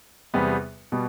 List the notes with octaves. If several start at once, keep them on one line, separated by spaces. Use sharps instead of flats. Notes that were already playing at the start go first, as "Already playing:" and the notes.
E2 C3 G3 B3
B2 G3 B3